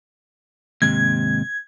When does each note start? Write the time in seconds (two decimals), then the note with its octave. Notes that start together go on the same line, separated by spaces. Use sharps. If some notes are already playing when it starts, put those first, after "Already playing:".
0.82 D#2 G#2 C3 G#6